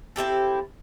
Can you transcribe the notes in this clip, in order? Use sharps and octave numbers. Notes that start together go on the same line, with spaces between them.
C4 E4 G4 A4